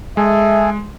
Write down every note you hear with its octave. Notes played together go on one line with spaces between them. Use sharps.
G#3 G#4 A4 E5 G#5